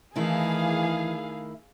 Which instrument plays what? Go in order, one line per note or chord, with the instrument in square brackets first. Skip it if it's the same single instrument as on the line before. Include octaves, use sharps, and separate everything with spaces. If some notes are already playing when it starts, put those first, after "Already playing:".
[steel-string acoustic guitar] D#3 A3 E4 [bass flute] E3 [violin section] G#4 F5